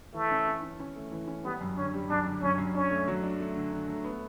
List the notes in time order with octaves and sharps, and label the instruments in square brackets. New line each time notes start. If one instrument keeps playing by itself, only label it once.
[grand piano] E3 [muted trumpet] A3
[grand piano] C#4
C#4
C#4
C#4
A3
E3
C#4
[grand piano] G3 [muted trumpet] B3
[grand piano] F#2
[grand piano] D3 [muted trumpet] C#4
[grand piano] G3
[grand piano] F#2 [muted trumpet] D4
[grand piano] D3
[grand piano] F#2 [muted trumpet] C#4
[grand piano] F#2
[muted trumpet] C#4 [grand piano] D4
[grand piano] A3
F#3
D4
A3
D3
D3
A3
B3